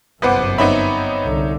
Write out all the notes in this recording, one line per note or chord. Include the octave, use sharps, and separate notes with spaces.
G1 C2 F#2 B3 B4 C5 F#5 D6
B3 C4 D#4 C#5 E5 B5
C2 D3